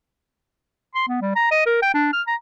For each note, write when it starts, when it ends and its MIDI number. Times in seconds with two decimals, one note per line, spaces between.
0.95 1.05 84
1.08 1.20 59
1.21 1.32 55
1.36 1.46 82
1.51 1.65 75
1.66 1.78 70
1.82 1.90 79
1.94 2.10 62
2.13 2.22 89
2.27 2.35 82